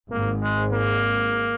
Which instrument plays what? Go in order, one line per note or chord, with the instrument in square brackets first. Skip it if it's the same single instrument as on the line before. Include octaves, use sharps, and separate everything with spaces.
[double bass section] G#1 G#2 [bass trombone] A#3
[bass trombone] G#3
A#3